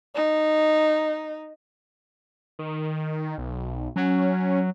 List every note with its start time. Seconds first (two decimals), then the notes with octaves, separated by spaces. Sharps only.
0.15 D#4
2.59 D#3
3.38 B1
3.96 F#3 C#4